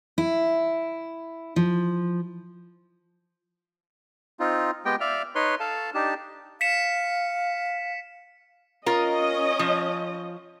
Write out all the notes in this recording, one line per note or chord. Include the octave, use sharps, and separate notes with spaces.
E4
F3
C4 D#4 F4
G#3 B3 G4 D#5 G5
D5 E5 F5 F6
D#4 B4 C#5 C6
A4 F5 A5
D4 D#4 G4 A5
F5 B6 C#7 E7
C#4 F4 A#4 D#5
F3